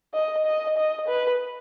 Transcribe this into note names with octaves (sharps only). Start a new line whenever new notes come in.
D#5
D#5
D#5
B4